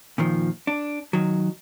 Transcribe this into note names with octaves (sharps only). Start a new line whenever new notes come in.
A#2 D#3 F3
D4
D#3 F#3